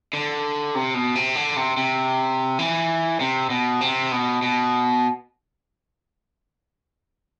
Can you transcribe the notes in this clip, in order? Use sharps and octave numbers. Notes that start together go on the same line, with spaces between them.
D3
C3
B2
C3
D3
C3
C3
E3
C3
B2
C3
B2
B2